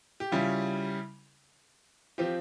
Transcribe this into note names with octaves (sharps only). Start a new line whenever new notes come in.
G4
C#3 G3 C#4 E4 F4
F3 C4 F4 G4